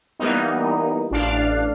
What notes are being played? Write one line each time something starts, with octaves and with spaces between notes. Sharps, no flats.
E3 G3 A#3 B3 D#4
A1 D4 F5